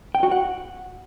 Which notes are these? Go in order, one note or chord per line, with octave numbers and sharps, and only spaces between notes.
G5
F#4
F#5